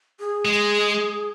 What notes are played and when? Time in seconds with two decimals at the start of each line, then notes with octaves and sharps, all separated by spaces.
0.20 G#4
0.45 G#3